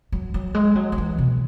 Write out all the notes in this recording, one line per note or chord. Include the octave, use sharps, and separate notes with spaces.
F#3
F#3
G#3
F#3
F#3
E3
B2